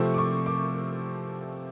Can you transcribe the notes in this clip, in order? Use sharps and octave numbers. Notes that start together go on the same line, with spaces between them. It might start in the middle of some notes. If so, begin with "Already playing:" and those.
Already playing: C3 F3 A3 C4 C#6
D6
C#6
D6